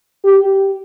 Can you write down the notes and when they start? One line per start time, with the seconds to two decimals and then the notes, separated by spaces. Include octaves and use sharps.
0.24 G4